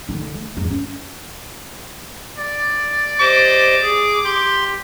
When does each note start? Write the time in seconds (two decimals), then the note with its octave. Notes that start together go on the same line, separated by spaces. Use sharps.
0.09 D3 D#4
0.34 A3
0.57 E2 G2
0.70 C#4
2.38 D5
3.20 G4 C5 D#5 D6
3.82 G#4
4.25 G4 C6